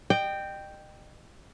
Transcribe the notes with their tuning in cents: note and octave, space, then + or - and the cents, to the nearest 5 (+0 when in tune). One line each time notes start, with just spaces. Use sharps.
D#5 -35 G5 +0